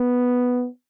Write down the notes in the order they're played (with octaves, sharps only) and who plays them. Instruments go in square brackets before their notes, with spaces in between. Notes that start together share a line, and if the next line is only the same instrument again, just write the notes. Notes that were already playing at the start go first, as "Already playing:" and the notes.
Already playing: [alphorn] B3